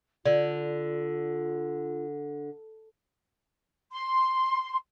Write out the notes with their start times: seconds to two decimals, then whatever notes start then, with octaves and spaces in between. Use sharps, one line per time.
0.25 D3 F4 D5
3.92 C6